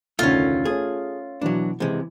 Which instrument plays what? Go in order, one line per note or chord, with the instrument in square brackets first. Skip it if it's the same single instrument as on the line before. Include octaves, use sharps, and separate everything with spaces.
[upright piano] F1 D2 D#3 [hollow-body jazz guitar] A3 C#4 [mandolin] F4
[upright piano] A3 C#4 [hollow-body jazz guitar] G#4
[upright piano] B2 E3 [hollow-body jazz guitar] F#3 D4
[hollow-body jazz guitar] C3 G#3 [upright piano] E3